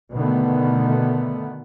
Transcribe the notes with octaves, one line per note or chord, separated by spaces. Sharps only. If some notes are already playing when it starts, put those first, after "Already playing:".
B2 D3 D#3 A3 B3